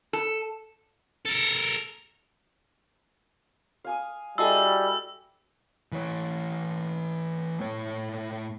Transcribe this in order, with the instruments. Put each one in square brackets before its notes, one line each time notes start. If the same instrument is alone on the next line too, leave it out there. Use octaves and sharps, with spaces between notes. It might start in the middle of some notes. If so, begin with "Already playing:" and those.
[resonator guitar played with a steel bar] A4
[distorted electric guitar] A4 A#4
[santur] F5 G#5 D#6
[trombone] G3 [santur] E4 F#4 A4 [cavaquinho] G#4 D#5 A5 [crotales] E6
[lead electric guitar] E3 C#5
A2 C#5